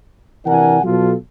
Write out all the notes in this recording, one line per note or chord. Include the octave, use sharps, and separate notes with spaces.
C3 E3 D4 A#4 F#5 G#5
B2 F#3 F4 A4